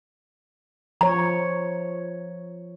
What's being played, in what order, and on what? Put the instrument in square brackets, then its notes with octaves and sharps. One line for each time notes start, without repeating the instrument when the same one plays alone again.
[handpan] F3 C#5 [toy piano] A#5